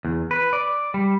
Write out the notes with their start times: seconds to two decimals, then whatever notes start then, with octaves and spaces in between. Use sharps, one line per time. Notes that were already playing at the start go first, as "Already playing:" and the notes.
0.05 E2
0.31 B4
0.53 D5
0.94 G3